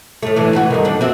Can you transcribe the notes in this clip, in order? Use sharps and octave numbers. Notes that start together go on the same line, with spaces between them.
A2 A3
E3 A3 D4
E3 E4 F#4
G2 D#3
F2 D4
C4 F#4 E5